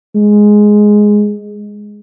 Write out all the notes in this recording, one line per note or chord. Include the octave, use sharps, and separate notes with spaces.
G#3